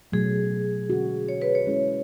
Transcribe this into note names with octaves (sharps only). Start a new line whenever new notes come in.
B2 F#3 A3 G#4
D3 G#3 C#4 F#4
C#5
B4
C#5
G#3 C#4 E4 G#4 B4